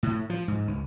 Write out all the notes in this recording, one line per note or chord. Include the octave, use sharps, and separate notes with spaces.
A2
F3
G#2
C#2